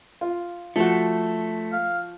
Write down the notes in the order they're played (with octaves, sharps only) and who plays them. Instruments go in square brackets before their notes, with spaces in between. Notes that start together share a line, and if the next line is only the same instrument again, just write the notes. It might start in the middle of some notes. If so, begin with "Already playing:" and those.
[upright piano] F4
[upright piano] F3 F#4 [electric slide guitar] A3
[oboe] F5